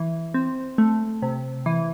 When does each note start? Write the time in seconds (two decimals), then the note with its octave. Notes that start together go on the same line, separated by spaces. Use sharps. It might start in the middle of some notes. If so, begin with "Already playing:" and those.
Already playing: E3
0.34 C4
0.78 A3
1.22 C3
1.66 E3